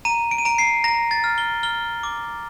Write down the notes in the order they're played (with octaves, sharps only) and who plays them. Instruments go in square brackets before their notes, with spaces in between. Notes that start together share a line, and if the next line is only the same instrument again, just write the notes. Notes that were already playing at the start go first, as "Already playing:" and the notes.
[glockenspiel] A#5 D#7
D7
D#7
A#5 D7
C7
A#5 A#6
A6
F6
G7
F6 G7
D6